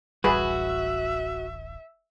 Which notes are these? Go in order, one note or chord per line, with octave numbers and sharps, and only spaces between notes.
D1 A1 G3 F#4 G#4 B4 E5